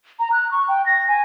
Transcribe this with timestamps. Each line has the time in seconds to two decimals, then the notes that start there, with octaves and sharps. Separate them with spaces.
0.20 A#5
0.32 F#6
0.51 C#6
0.68 G5
0.86 A#6
1.08 G#5